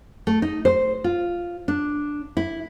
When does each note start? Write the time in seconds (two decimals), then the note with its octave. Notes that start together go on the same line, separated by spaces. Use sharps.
0.27 A3
0.42 D#4
0.65 C5
1.04 F4
1.68 D4
2.37 E4